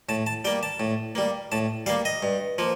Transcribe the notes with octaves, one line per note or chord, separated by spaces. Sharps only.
A2 A5
A5
G3 A#3 G5
A5
A2
G3 A#3
A2 A5
G3 A#3 F5
D#5
G2
F3 A#3